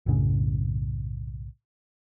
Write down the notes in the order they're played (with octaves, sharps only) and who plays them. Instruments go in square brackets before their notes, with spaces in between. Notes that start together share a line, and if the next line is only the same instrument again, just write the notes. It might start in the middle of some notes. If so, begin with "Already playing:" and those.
[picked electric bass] B1 F#2 A2 C#3